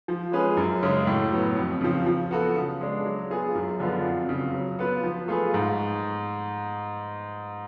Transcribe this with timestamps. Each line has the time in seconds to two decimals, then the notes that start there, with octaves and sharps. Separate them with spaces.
0.08 F3
0.32 G#3 C#4 G#4 B4
0.57 F#2
0.83 C#3 G#3 C#4
1.07 A2
1.32 F#3 B3
1.56 F2
1.81 C#3 F3
2.06 F3
2.31 B3 F#4 A4
2.56 C#3
2.81 G#3 D4
3.05 F#3
3.30 B3 F4 G#4
3.55 F#2
3.80 D3 F3 B3 F4
4.05 F2
4.29 C#3 F#3
4.54 F#3
4.79 B3 F4 B4
5.04 F3
5.28 A3 F4 G#4 B4
5.54 G#2